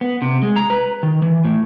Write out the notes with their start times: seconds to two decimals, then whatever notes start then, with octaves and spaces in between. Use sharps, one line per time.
0.01 B3
0.22 C3
0.43 G#3
0.56 A#5
0.70 B4
1.03 D#3
1.22 E3
1.45 A2